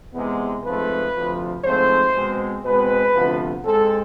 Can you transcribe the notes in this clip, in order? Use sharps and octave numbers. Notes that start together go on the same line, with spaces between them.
E2 C3 G#3 B3
G#2 F3 A3 C4 B4
D2 C3 F3
G#2 F3 A3 C4 C5
B2 G#3 C4
B2 G#3 C4 B4
D2 C3 F3 B3
G#2 G#3 C4 A4